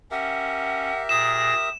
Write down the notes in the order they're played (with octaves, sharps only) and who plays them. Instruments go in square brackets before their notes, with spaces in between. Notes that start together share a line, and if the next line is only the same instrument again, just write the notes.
[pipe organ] C#4 [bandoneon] G4 A#4 E5 [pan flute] F#5
[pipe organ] A#2 G#4 A#6 [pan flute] D#6 [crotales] E7